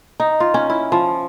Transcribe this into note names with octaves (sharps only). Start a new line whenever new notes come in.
D#4
F4
C#4
E4
F3